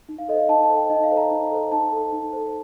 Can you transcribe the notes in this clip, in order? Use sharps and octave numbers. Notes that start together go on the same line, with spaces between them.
D#4
F5
A4 C5 D#5
F5
D#4 A5
A5
A4 C5
G5
D#4 D#5
F5
A4 C5
A#5
D#4
A4 C5
D#4 A5
A4 C5
D#4
A4 C5